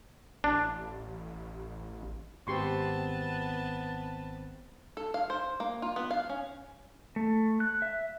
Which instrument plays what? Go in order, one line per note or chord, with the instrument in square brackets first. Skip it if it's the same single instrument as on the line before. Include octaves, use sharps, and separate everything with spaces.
[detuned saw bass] A1 [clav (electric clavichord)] D4
[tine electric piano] G#1 C4 [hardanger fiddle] B3 A5 [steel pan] G4 C6 C#6
[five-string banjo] A4
F5
C5
A#3
F4
B3
F5
C#4
[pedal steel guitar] A3
F#6
E5